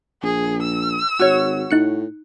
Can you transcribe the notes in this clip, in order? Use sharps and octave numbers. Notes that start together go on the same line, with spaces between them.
A#1 G#4
E6
G#1 F#4 C#5
A2 D#4 F#6 C#7